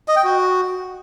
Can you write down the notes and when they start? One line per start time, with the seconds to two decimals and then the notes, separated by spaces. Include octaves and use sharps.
0.08 D#5
0.16 G5
0.24 F#4